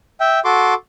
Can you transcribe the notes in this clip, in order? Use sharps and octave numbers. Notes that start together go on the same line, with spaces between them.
E5 G5
F#4 A4 C6 D6